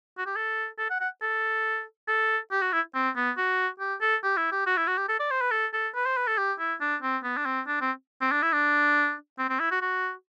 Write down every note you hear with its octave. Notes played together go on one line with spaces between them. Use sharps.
F#4
G4
A4
A4
F#5
F#5
A4
A4
G4
F#4
E4
C4
B3
F#4
G4
A4
G4
E4
G4
F#4
E4
F#4
G4
A4
D5
C5
B4
A4
A4
B4
C5
B4
A4
G4
E4
D4
C4
B3
D4
C4
D4
C4
C4
D4
E4
D4
C4
C4
E4
F#4
F#4